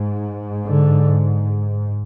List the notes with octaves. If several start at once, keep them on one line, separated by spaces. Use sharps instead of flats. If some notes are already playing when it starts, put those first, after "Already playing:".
Already playing: G#2
D3